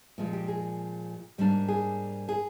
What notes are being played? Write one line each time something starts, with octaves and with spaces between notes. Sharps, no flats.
A#2 F3 G#3
G4
G#4
G#2 G3 A#3 D4
G#4
G#4